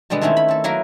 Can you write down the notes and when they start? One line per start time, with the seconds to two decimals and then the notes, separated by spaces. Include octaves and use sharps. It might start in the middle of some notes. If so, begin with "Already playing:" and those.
0.10 B2 D3 G3 G#3 B3
0.21 D#3 A3 C4 C#4 E4
0.37 B5
0.48 C4 A4
0.64 F#3 A#3 E4 A#4 B4